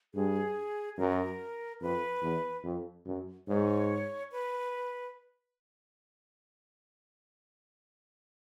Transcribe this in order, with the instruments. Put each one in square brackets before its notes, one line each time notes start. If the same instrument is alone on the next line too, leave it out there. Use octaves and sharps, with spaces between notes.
[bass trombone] G2 [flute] G#4
[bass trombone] F#2 [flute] A#4
[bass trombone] F2 [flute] B4
[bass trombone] E2
F2
F#2
[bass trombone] G#2 [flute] C#5
[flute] B4